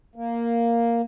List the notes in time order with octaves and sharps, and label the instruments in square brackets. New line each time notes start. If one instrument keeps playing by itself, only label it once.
[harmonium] A#3